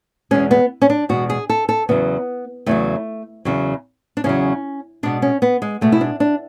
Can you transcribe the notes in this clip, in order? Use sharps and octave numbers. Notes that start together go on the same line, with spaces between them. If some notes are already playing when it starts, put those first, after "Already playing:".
E2 B2 G#3 C#4
B3
C#4
D4
E2 B2 G#3 F#4
G#4
A4
A4
E2 C#3 F#3 B3
E2 C#3 F#3 A3
E2 C#3 F#3
D4
E2 C#3 F#3 C#4
B2 G#3 D4
C#4
B3
G#3
B2 G#3 A3
E4
D4
D4